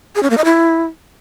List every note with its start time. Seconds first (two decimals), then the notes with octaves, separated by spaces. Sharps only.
0.15 G#4
0.23 C#4
0.30 A#3
0.37 D#5
0.45 E4